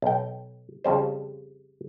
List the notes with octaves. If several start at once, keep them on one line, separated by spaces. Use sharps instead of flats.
B1 G5
F2 C#3 G3 C5